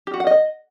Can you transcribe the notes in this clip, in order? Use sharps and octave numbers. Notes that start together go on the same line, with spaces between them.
G4
F#4
F#5
D#5